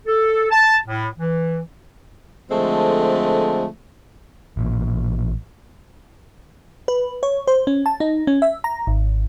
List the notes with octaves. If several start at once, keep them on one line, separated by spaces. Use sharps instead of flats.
A4
A5
A2
E3
D3 F3 G#3 A3 C4
A1 A#2
B4
C#5
C5
C#4
A5
D#4
C#4
E5
A#5
G#1